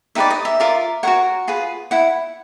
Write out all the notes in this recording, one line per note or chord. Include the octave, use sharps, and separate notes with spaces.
D#4 G4 B4 D5 E5
D#5
E5
F4 A#4 D5
F#4 A#4 C#5 F#5
F4 G#4 B4
E4 F#5